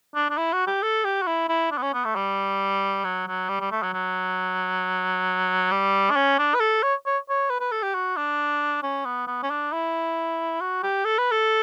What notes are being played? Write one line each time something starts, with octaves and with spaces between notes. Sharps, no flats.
D4
D4
E4
F#4
G4
A4
G4
F#4
E4
E4
D4
B3
C#4
B3
A3
G3
F#3
F#3
G3
G3
A3
F#3
F#3
G3
D4
C#4
D4
B4
A4
C#5
C#5
C#5
B4
B4
A4
G4
F#4
D4
C#4
B3
B3
C#4
D4
E4
F#4
G4
A4
B4
A4